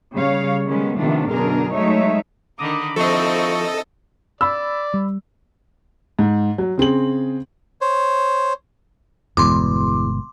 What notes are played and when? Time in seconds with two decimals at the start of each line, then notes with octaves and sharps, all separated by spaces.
0.15 C#3 G3 C#5 F5
0.67 D#3 G3 G#3 B3 C#4
0.99 C3 D#3 F3 A3 B3 D4
1.30 F#2 B2 D3 D4 G#4 A#4
1.74 F#3 G#3 A3 D#4 C#5 E5
2.59 D3 D#3 A#5 B5 D6 D#6
2.96 F3 C4 D#4 E4 A4 D#5 C#6
4.41 D5 B5 E6
4.94 G3
6.19 G#2
6.58 F#3
6.78 C#3 C4 G#4 F#7
7.81 C5 C#5
9.37 G1 E2 B2 G#3 C6 D6